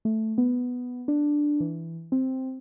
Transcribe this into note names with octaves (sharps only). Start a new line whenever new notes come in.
A3
B3
D4
E3
C4